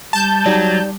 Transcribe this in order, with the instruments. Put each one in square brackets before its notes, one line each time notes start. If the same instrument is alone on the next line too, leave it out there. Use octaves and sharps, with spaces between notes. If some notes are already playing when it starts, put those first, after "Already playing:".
[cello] G3 [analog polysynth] A5 G6
[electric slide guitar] F#3 [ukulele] D#4 G4 D5